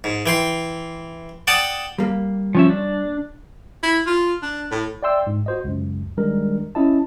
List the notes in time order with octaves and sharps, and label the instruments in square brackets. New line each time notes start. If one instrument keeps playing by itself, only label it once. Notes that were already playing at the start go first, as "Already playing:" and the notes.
[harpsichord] G#2
E3 G5 C6
D5 F#5 G5 A5 D#6
[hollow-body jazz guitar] G3 A#3
[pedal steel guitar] F3 C#4 E5
D4
[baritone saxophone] E4
F4
D4
A2
[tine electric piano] D5 E5 G5 C6 E6
G#2
F#4 C5 D#5
C#2 F#2
D#3 G3 G#3 D4 A#4
C#4 E4 D#5 A5